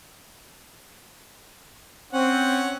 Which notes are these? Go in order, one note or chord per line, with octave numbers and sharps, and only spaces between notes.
C4 C#4 C#5 F#5